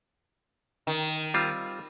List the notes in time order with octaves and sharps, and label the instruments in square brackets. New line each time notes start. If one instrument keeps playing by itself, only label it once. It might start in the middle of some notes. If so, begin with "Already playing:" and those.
[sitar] D#3
[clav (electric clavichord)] G3 C4 F4